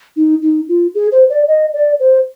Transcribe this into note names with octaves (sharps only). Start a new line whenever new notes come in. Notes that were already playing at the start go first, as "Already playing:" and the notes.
D#4
D#4
F4
G#4
C5
D5
D#5
D5
C5